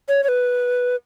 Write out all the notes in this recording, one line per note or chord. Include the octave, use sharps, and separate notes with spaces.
C#5
C#5
B4